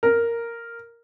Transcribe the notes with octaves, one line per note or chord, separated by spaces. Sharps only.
A#4